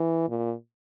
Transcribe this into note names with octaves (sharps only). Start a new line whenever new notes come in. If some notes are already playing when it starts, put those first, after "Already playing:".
Already playing: E3
A#2